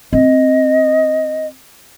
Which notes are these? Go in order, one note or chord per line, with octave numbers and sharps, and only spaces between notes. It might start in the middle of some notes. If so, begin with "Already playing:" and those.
C4 D#5